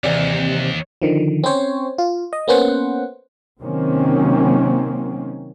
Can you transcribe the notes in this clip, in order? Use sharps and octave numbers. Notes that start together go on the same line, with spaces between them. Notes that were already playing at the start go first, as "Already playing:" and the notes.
D#2 G#2 C3 E3 D5
D3 D#3 F3
C4 C#4 C5 C#5
F4
D#5
A#3 B3 C#4 C5 F#5
C3 D#3 F#3 A#3 C4 C#4